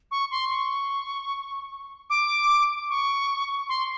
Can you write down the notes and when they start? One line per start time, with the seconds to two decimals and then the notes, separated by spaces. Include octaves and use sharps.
0.11 C#6
0.31 C6
0.51 C#6
2.10 D6
2.90 C#6
3.69 C6